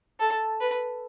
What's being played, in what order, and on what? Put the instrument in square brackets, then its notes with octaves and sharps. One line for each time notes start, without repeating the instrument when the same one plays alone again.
[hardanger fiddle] A4
B4